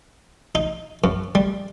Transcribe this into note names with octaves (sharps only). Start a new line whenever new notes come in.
D#4
F#2
G3